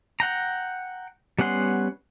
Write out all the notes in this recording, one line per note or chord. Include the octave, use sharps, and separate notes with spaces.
F#5 G5 A#5
G3 B3 C#4 F#5 C6